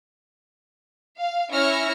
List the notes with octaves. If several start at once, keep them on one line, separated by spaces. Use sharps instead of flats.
F5
C#4 E4 E5 F6 A#6 C#7